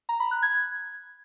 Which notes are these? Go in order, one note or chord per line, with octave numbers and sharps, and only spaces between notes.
A#5
B5
F#6
G#6